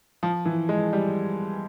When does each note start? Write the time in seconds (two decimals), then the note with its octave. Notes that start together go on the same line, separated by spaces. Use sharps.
0.23 F3
0.45 E3
0.69 G#3
0.93 G3